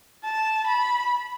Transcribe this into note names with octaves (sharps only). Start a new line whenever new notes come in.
A5
B5